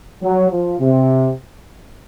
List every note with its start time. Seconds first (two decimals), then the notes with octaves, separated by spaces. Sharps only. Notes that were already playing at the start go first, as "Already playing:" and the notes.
0.23 F#3
0.51 F3
0.80 C3